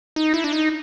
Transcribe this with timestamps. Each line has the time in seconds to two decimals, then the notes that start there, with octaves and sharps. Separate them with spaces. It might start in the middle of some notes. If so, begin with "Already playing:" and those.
0.16 D#4
0.34 E4
0.44 D4
0.53 D#4